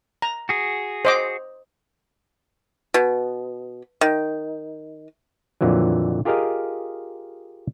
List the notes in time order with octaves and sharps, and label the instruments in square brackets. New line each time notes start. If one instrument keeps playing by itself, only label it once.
[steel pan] A#5
[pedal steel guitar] F#4 G#4
[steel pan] C5 D#5 D6
[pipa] B2
D#3
[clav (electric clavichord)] F2 A#2 D3 E3 F#3
F4 G4 G#4 A#4 D#5 F5